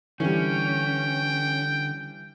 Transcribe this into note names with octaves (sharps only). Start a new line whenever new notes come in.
D3 E3 G3 C#4 G5